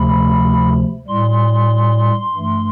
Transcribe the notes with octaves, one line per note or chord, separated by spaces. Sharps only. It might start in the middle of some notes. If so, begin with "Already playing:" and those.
Already playing: D2 C3 F3 A3 B5
A2 G3 C6
G2 E3 A3